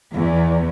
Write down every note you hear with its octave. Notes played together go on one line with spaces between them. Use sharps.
E2